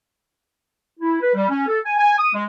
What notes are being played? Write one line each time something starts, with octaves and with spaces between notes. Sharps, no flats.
E4
B4
G3
C#4
A4
G#5
G#5
D#6
G#3